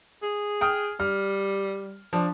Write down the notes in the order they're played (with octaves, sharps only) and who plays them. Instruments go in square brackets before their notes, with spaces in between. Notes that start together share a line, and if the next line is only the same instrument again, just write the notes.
[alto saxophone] G#4
[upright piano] G5 D#6 F6
[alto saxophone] G3 [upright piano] F6
[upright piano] F3 D4